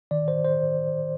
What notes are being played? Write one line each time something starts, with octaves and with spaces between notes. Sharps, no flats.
D#3 D5
C5
C5